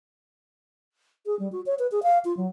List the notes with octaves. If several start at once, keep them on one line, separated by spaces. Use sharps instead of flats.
G#4
G3
F#4
C#5
B4
G#4
F5
F4
F#3